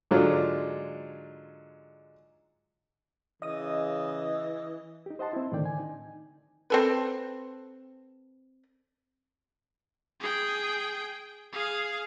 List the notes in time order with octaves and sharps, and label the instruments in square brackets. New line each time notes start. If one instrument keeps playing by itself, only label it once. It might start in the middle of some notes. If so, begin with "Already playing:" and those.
[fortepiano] G#2 D3 F#3 G#3 D4 F4
[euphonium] C#3 [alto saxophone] E3 [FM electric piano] D#5 D#6
[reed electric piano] D#4 G4
C5 D#5 F#5 A5 C6
C4 E4
A2 D3 D#3 D5 G5
G#5
D#4
[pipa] C4 A4 B4
[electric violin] G#4 G5
G#4 F5